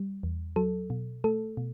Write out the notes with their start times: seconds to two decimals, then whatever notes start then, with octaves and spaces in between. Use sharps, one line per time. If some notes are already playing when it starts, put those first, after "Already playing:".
Already playing: G3
0.23 E2
0.56 F#3 A4
0.90 B2
1.24 A3 A4
1.57 B2